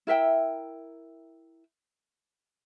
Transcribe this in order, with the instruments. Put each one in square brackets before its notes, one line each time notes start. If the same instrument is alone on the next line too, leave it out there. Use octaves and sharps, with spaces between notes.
[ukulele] E4 A#4 E5 G5